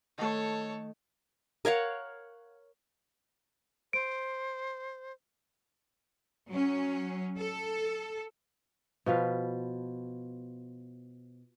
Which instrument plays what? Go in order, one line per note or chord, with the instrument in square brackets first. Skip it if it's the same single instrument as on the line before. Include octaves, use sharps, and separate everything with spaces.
[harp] D#3 A3 [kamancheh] A4 C#5
[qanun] A#4 C#5 F5 F#5
[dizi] C5 [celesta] D7
[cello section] F#3 C#4
A4
[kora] B2 F3 B4 F5